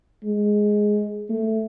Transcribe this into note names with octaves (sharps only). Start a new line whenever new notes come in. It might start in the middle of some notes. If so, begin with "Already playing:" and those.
G#3
A3